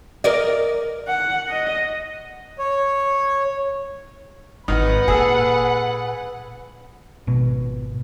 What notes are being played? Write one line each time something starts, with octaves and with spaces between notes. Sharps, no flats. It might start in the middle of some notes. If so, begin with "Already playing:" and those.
A#4 D5 D#5
F#5
D#5
C#5
G#1 D#3 D#4 B4 F#5
A#2 G#4 A4
G#1 B2